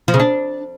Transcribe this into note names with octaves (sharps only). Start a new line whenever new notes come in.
F3
C#3
D4